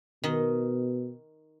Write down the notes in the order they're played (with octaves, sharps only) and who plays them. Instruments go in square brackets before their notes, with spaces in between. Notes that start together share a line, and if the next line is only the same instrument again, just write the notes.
[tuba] B2 [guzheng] D#3 D#5